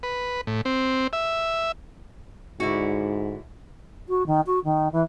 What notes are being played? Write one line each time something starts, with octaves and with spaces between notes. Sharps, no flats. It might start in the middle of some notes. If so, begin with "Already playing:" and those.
B4
A2
C4
E5
G#2 D3 E4 F#4
F#4
D#3
F#4
D#3
E3